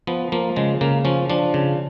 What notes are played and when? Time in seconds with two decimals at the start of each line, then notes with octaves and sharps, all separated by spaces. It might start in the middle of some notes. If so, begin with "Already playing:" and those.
0.07 F3 B3
0.32 F3 A#3
0.56 C#3 G#3
0.81 C#3 A#3
1.05 F3 C#4
1.30 F3 D4
1.54 C#3